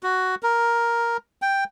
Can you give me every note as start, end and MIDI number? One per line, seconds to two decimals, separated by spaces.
0.03 0.35 66
0.43 1.17 70
1.42 1.64 79